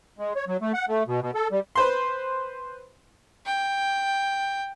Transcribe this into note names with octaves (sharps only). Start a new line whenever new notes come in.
G#3
C#5
F#3
A3
F#5
A3
B2
B2
A4
G3
B4 C5 C6
G5